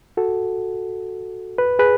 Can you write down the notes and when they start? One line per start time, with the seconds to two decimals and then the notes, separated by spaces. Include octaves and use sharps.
0.17 F#4 A4
1.58 B4
1.79 G#4 B4